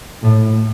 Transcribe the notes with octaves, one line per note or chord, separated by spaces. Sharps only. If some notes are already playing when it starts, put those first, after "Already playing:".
A2